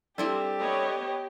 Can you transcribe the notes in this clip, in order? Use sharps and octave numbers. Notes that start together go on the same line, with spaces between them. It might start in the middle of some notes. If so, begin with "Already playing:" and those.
G3 C4 D4 E4 G4 A4 D5
B3 C#5 D#5